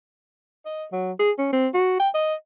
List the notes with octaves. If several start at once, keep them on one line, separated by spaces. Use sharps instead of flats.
D#5
F#3
G#4
C#4
C4
F#4
G5
D#5